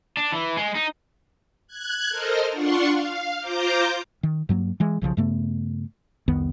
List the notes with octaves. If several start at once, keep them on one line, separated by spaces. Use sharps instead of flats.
D4
E3
G#3
D#4
F#6 G#6
A4 A#4 C5 D#5 F6
D4 F4 F#5 C6 C#6
F5
F4 C5 A#5 D6 G6
D#3
G2 F#3 A3 A#3
E3 G#3
B1 C#3 E3 F3
G2 C#3 A3 B3
C2 F2 D#3 B3